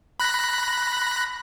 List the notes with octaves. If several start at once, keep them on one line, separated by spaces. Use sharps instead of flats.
B5 F#6 A#6